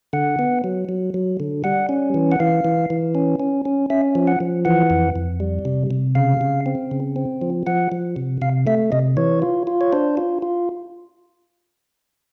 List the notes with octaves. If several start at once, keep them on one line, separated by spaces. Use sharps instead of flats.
D3 F#5
B3
F#3
F#3
F#3
D3
G3 F#5
C#4
E3
F#5
E3 F5
E3
E3
C#4
C#4
C#4
C#4 E5
F3
F#5
F3
E3 F#5
F2
F2
G3
C3
C3
C#3 F5
C#3
C4
C#3
C4
F3
F3 F#5
F3
C3
C3 F5
A3 E5
C3 D#5
E3 C#5
F4
F4
C#5
D4 C5
F4
F4